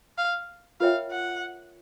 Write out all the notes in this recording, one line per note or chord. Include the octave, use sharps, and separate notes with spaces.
F5
F4 A#4 C#5 E5 F5 G5
F#5